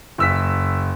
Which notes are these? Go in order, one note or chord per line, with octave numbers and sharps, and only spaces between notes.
F#1 E6 B6